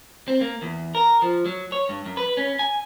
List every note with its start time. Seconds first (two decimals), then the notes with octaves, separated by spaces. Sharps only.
0.28 C4
0.41 A#3
0.62 E2
0.95 A#4
1.22 F3
1.46 F#3
1.72 C#5
1.89 G2
2.05 F#2
2.17 B4
2.37 C#4
2.59 G#5